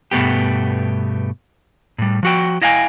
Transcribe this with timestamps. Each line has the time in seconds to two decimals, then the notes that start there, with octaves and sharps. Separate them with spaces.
0.11 G2 B2 A3 B3 G4
1.98 A2 G3
2.23 F3 F#4 G5
2.62 E4 D#5 F5 G5 G#5